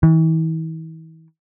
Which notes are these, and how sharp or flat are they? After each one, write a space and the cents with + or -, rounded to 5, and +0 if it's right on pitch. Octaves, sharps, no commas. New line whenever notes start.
E3 -40